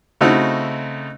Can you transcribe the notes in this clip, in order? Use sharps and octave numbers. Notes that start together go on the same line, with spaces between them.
C#3 A3 C4 D#4 E4 F#4